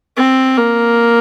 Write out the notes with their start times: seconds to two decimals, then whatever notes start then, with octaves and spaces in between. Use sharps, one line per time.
0.17 C4
0.57 A#3